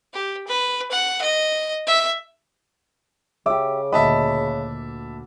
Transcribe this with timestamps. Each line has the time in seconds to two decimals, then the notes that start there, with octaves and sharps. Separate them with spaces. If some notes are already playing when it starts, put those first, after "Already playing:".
0.14 G4
0.47 B4
0.91 F#5
1.22 D#5
1.87 E5
3.46 C#3 G4 E5 D6
3.92 D2 A#2 D#5 E5 F#5 A5 B5